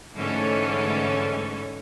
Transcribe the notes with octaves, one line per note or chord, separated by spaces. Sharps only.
G#2 D3 E3 A3 C#4 A4